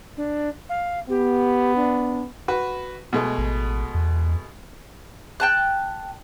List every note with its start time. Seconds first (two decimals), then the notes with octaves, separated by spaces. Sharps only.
0.17 D4
0.69 F5
1.09 B3 G4
1.76 D4
2.48 F#4 B4
3.13 B2 G#3 A3
3.38 A1
3.94 E2
5.40 G5 A5 F#6